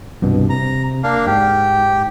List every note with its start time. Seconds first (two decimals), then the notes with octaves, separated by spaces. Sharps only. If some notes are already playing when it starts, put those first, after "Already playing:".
0.22 C2 G2 B2
0.50 C3 A#5
1.03 A#3 D4 F5
1.27 G#2 G4